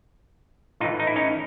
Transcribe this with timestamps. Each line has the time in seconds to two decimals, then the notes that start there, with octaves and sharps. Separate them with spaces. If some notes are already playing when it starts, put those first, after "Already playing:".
0.80 A2 D#4 F4
0.84 E3
1.00 D#4
1.07 E4
1.16 C#4 D#4